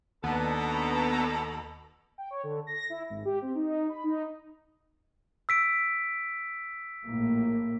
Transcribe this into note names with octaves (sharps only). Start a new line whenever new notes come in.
D#2 B2 B3 D4 A4 A#5
G5
C#5
D3
A#6
E4
G#1
G4
C4
D#4
B5
D#4
E6 B6 D7
A#1 A2 A#3